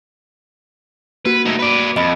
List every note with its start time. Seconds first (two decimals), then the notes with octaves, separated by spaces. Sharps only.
1.26 A#3 F#4 B4
1.46 A3 D#4
1.59 B4 D5
1.96 F2 D#5 B5